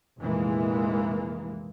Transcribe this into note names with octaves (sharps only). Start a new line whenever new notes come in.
F1 A#1 E3 G#3 A#3